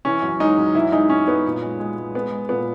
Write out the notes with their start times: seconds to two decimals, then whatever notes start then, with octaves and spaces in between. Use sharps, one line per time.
0.05 E3 C#4
0.22 F#2
0.40 G#3 D#4
0.58 F#2
0.75 E3 E4
0.92 G#3 D#4
1.10 F#2 C#4
1.27 F#2 B3
1.45 A#2
1.63 G#3
1.80 G#3
1.97 G#3
2.15 G#3 B3
2.32 G#3
2.49 A#2 B3